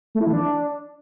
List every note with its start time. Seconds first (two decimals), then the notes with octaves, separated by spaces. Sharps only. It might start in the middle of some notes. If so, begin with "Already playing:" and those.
0.15 A3
0.21 E4
0.27 E3
0.33 D4